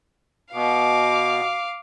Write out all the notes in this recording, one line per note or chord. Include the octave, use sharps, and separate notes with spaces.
B2 F5 D6